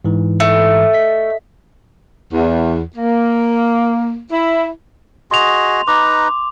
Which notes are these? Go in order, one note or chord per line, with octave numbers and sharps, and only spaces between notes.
G#2 E3
A3
D#5 B6
E2
A#3
E4
F#4 G#4 D#5 C6 F7
D#4 B4 A#5 D6